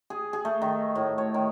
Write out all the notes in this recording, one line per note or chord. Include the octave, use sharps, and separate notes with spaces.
G#4
G#4
A3
D#3
A2
C#5
D#3